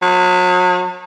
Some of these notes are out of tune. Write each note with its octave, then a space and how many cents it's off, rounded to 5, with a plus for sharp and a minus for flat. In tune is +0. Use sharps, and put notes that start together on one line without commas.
F#3 -35